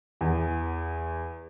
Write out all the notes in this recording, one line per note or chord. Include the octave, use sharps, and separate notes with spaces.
E2